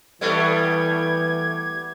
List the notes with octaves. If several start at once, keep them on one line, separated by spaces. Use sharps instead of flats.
E3 G3 A3 B3 G#6